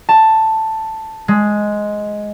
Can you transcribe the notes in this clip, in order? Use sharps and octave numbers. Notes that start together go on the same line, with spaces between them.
A5
G#3